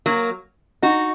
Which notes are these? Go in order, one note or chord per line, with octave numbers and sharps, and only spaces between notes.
F#3 A#3
D#4 F#4